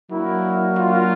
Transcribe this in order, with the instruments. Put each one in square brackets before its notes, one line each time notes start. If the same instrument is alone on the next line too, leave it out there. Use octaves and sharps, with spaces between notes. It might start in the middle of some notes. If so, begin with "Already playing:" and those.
[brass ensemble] F#3 A#3 D4 F#4 A#4 [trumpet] E4
[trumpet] F4